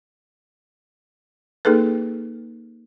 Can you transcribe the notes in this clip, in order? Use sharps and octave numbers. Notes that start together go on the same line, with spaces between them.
A#3 D#4 G#4 A4 B4